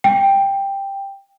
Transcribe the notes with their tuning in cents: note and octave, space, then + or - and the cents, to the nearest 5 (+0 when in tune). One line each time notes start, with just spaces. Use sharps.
G5 +10